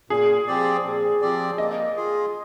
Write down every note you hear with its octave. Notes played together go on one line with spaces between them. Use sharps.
A#2 G#4
F3 C4 G4 D5
A#2
F3 C4 G4 D5
A#3 D#5
F4 G#4